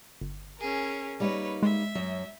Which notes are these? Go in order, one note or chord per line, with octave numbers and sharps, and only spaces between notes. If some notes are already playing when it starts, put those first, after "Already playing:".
G1
C#4 G#4 A#4
G3 A#3 D#4 B4 C#5
G#3 E5
F#2 F#3